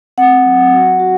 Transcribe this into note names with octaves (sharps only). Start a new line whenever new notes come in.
C4 F#5
F#3
F#4
F#4